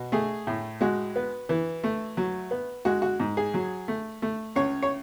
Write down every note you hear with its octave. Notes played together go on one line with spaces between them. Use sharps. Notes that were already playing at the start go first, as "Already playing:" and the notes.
Already playing: B2
A3 G#4
A2
G#3 F#4
B3
E3
A3
F#3
B3
G#3 F#4
F#4
G#2
G#4
F#3
A3
A3
C#2 C#5
C#5